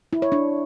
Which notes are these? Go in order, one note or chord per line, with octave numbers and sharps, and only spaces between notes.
E4
C#5
D4